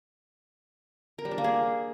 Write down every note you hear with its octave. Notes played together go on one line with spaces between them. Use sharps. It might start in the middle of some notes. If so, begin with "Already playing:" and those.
A#4
G3
D4
A#3
G#4